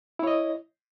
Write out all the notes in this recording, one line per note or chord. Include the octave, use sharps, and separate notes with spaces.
E4 C#5 D#5